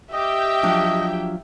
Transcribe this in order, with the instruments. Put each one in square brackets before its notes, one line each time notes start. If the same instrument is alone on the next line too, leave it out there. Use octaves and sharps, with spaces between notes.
[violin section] G4 G5 [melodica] D#5 [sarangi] E5
[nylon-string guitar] F3 F#3 D4